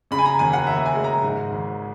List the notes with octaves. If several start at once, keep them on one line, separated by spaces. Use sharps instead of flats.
C#3 B5
G#5
A#5
D#2 G#5
F#5
D#2 E5
G#5
G#3
A#5
G#2
G#1